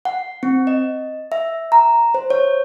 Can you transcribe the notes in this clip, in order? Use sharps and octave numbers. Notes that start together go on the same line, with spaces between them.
F#5
C4
D#5
E5
A#5
C5
C#5